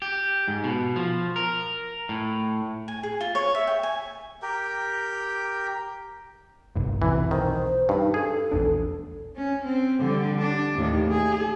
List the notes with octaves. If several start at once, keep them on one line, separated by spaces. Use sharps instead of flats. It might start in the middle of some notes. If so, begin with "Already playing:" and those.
G4
G#2
B2
F3
A#4
A2
G#5
G#4
F4
C#5
E5
G5
G#5
G4 A#4 G5
G1 C2 G2
B1 E2 C3 E3
D#3 C5
G2 D#4
G#4 A4
A#1 E2 D4
C#4
C4
D3 G3
D4
D#2 A2
G#4